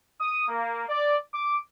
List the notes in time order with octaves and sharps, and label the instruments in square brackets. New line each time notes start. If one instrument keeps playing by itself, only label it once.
[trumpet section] D#6
A#3
D5
D6